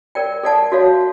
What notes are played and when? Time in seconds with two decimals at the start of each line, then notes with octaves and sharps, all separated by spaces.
0.15 A#4 D5 G5
0.43 A4 D5 F#5 A5
0.72 F#4 A4 C#5 F5